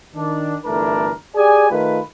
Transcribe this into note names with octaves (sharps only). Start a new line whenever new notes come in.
D#3 D4
G1 E3 A3 D4 E4 A#4
G4 G#4 D5 G#5
D#3 A3 F4 B4